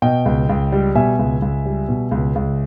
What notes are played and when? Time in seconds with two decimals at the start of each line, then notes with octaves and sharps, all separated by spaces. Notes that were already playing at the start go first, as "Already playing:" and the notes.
0.02 B2 D#5 G5
0.25 C#2
0.49 C#2
0.72 G3
0.95 B2 E5 G#5
1.19 C#2
1.42 C#2
1.65 G3
1.89 B2
2.11 C#2
2.35 C#2